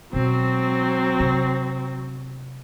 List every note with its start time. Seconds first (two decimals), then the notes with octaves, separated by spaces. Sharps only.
0.13 B2 F#3 G#3 C4
1.20 C3